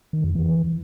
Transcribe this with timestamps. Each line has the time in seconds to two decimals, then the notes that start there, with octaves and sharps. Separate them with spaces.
0.13 D#3
0.24 F2
0.35 E3